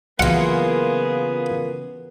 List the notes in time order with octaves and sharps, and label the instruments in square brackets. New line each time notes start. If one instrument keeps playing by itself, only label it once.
[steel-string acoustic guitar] C#3 E3 F#3 [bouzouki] A#3 F4 [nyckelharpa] B3 G#4 [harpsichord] F#5